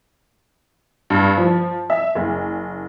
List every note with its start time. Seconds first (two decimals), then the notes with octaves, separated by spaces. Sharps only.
1.10 G2
1.38 F3
1.90 E5
2.15 F#1